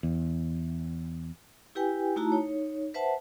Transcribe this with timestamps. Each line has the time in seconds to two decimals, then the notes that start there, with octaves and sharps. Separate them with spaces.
0.03 E2
1.75 E4 G4 B4 G5 G#5
2.16 A3 D#4 E4 F#4 A5 A#5
2.32 D#4 C#5
2.94 B4 C5 E5 F#5 A5